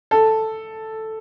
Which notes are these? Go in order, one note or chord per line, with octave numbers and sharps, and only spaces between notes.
A4